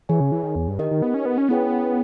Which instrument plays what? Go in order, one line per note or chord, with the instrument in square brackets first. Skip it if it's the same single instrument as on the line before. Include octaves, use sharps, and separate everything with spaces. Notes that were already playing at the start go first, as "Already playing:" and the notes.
[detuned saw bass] E3 [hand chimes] G#4 C#5 G#5
[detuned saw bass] C#3
E3
D#3
E2
G2
[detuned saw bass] D#3 [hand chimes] D#4 G4 A#4 D#5
[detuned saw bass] D#3
B3
C#4
B3
C#4
[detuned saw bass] B3 [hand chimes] C#4 E4 G#4 C#5 G5